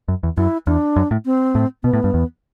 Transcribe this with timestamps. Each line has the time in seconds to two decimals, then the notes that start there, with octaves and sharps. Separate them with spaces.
0.08 F#2
0.23 E2
0.37 F#2 E4
0.67 E2 D4
0.96 F#2
1.11 A2
1.25 C4
1.55 A2
1.83 B2 B3
1.93 A2
2.04 G2
2.14 E2